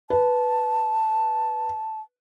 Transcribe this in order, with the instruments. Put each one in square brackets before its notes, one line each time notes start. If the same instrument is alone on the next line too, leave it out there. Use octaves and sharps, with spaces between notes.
[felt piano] B4 [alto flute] A5